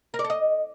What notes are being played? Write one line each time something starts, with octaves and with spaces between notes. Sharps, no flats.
A#4
D5
A4
D#5